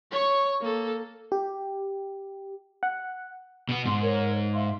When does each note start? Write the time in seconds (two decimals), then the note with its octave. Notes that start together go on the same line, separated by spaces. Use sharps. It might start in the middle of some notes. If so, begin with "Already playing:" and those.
0.12 C#5 C#6
0.61 A#3 A4
1.32 G4
2.83 F#5
3.69 B2 B3
3.86 G#2 C6
4.02 A#4 C#5
4.54 E5 F5 C6